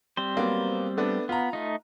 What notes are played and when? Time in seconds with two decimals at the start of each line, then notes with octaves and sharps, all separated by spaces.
0.17 G3 C4 C5
0.35 F#3 A#3 B3
0.97 A3 B3 D4
1.29 B3 F4 A#5
1.53 A3 D#4